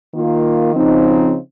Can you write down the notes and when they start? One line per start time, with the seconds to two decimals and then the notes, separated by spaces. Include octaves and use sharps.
0.11 D#3 A#3 F4
0.73 C#3 F3 C4 D#4